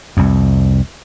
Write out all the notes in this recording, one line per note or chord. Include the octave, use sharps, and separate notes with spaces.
C2 F2